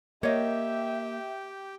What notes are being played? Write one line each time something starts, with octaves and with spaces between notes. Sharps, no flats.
A#3 G4 C#5 D#5 E5 G5